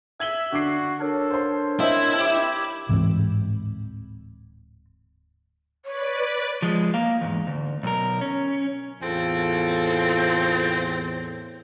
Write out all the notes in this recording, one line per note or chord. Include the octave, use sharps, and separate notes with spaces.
E5 G#6 F#7 G7
D3 F#4 D6 C7
D4 A4 A#4 C#5
C5 C6
C4 E4 C5 D#5 E5
G4 B5 D6 E6 G#6
D1 G#2 E3 C4
B4 C#5 D5
F3 G#3
A#3 F5
E2 G#2
D2
B1 A#4
C#4
E2 A2 C4 F4 A4